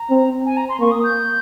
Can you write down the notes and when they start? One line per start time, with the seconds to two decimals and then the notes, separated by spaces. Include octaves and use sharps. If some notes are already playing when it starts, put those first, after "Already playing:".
Already playing: A#5
0.10 C4
0.46 G#5
0.57 A#5
0.69 C6
0.80 A#3 C#6
0.91 D#6
1.04 G6